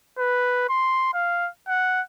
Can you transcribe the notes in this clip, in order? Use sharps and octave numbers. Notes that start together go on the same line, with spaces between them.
B4
C6
F5
F#5